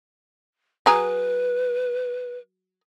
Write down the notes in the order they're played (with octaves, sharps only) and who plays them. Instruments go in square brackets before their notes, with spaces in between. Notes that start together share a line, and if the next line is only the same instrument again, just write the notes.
[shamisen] F#3 G#4 A#5 [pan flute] B4